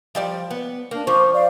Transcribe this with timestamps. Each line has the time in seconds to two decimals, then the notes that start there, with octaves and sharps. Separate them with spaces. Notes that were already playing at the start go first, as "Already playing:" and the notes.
0.15 F3 G3 D5
0.51 B3
0.91 A#3 D4
1.07 F3 F4 C5 C#6 D6
1.33 D5 F5